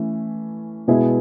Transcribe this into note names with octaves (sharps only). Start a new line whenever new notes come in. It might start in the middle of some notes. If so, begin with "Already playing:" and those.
Already playing: E3 A3 C#4
B2 G#3 B3 E4 G#4